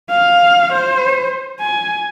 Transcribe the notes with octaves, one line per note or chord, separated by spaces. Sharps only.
F5
C5
G#5